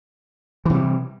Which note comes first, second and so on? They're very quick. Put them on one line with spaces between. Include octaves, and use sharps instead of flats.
E3 C3 G3